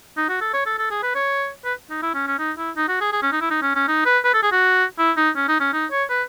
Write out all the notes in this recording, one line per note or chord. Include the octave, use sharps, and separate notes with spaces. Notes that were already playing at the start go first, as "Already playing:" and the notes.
D#4
F#4
A4
C#5
A4
A4
G#4
B4
C#5
B4
D#4
E4
C#4
C#4
D#4
E4
D#4
F#4
G#4
G#4
C#4
D#4
E4
D#4
C#4
C#4
D#4
B4
B4
A4
G#4
F#4
E4
D#4
C#4
D#4
C#4
D#4
C#5
B4